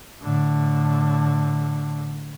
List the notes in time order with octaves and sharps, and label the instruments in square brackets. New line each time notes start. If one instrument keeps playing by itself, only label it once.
[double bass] A2 D3